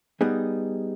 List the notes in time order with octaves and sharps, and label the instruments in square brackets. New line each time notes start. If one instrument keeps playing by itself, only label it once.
[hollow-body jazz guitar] G3 B3 D#4 G#4